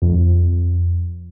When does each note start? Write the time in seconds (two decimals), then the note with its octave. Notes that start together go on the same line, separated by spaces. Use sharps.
0.02 F2